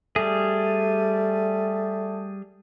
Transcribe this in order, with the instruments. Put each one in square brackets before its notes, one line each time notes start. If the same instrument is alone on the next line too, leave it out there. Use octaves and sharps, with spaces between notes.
[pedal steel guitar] G3 G#4 [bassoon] A3